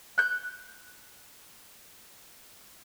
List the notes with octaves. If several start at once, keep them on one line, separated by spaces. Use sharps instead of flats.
F#6 G6